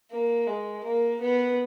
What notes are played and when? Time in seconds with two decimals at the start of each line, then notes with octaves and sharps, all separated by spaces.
0.11 A#3
0.47 G#3
0.84 A#3
1.22 B3